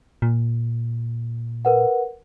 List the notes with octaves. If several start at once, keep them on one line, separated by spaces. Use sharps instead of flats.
A#2
A#4 B4 F#5